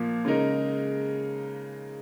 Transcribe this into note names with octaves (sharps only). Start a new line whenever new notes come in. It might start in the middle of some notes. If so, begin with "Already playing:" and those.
Already playing: A#2 F3 A#3
C#3 G#3 D#4 A#4